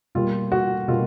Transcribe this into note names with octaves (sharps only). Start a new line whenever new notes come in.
B2 G3 A#3 F4
F#4
B2 G3 A#3 F4